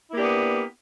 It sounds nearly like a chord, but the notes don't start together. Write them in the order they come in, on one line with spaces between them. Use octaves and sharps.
E4 A#3 G4 D4 B3